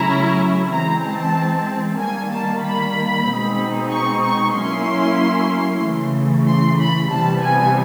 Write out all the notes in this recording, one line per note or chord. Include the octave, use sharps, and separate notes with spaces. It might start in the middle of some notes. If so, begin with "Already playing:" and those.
Already playing: C#3 F#3 A3 C#4 E4 A#5
E3 G#3 C4 A#5
A5
D#3 G3 A#3 G#5
A5
B5
B2 G#3 C4 D#4
C#6
C#6
F#3 A#3 C#4 E4 C6
C#3 E3 A3
C6
B5
C3 E3 G3 B3 A5
G#5